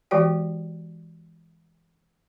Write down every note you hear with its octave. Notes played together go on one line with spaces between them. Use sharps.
E3 G#3 F#4 G4 D5 G5